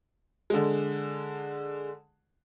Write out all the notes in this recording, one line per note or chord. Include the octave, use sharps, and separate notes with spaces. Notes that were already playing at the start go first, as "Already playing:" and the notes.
D3 G#3